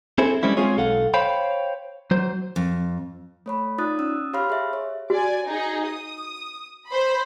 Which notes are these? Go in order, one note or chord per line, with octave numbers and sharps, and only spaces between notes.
C4 E4 G#4 A4 C5
G3 G#3 C4 C#4 E4
G#3 C4 F4 G#4 C#5
B1 A4 F5 F#5
C5 C#5 F5 G5 B5
F#3 C5
F2
A3 C#5 B5
D#4 F4 D5 D#6 F#6 A6
C#4 D#6 E6
G4 C#5 F5 B5 C6 F6
G#4 E5
C#5
F#4 D5 G#5
D#4 G#4
D#6
C5 B5